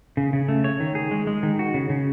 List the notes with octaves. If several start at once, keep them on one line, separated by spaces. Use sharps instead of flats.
C#3
C#3
A3
C#5
D#3
G#4
G#3
G#3
D#3
F#4
C#3
C#3